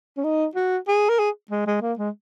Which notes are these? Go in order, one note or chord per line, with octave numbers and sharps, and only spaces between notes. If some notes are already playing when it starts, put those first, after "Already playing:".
C#4
D#4
F#4
G#4
A#4
G#4
G#3
G#3
A#3
G#3